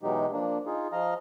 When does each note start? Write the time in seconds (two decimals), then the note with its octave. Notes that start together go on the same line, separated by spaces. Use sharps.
0.03 B2 E3 F#3 G#3 D#4 G4
0.32 F3 A#3 D4
0.66 D#4 F4 G#4
0.92 F3 D#5 F5 A#5